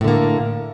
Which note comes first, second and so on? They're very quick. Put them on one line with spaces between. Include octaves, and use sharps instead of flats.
A2 D3 A#3